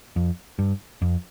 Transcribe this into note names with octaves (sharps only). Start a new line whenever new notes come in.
F2
G2
F2